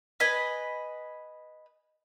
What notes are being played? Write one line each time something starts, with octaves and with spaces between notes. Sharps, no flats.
B4 D#5 G#5